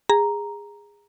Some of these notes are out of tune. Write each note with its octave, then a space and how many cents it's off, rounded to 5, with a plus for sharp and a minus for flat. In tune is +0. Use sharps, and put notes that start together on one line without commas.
G#4 -20 A#5 +0